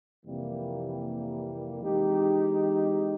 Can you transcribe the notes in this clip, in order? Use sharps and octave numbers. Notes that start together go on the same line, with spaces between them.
F2 C3 E3 G3 A#3
E3 G#3 C4 D#4 G4